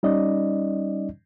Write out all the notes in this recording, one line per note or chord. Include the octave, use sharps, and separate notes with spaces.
G3 C#4 D#4 D5 D#5